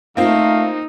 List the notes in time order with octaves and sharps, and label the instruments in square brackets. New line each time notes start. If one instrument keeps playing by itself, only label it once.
[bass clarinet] A3 [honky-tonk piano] A#3 C4 F4 [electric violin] D#4 [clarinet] F5